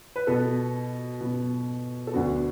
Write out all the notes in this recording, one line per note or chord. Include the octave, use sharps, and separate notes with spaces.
B4
B2 B3 A4
B2 B3
A4
D2 D3 B3 F#4